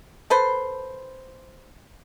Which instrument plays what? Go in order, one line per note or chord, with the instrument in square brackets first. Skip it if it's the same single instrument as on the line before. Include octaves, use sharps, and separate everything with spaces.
[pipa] A4 B4 C5